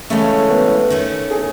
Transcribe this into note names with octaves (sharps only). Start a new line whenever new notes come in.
C#3 E3 G#3 A3 C#4
B3
D#3 A3 C#4
G#4